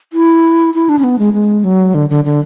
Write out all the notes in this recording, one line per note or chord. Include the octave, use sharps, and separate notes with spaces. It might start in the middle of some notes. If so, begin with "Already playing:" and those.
E4
E4
D4
C#4
B3
G#3
G#3
F#3
D3
D3
D3